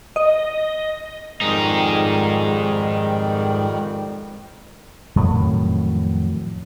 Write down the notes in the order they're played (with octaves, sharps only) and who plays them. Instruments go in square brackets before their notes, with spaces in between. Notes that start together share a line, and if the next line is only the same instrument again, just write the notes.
[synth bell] D#5
[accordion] F2 D#3 G3 [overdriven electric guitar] G#2 D#4
[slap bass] F2 A2 D#3 F#3